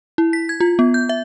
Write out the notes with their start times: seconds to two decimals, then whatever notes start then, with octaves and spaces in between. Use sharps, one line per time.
0.18 E4
0.33 B6
0.49 G#6
0.60 F4
0.79 B3
0.94 G6
1.09 E5